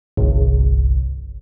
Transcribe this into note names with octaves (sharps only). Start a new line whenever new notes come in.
G1 C2